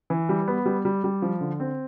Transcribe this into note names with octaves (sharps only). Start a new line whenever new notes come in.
E3
G3
B3
G3
G3
G3
F3
D3
C4